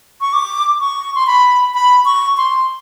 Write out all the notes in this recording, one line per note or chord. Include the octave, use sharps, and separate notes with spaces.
C#6
D6
C#6
C6
B5
B5
C#6
C6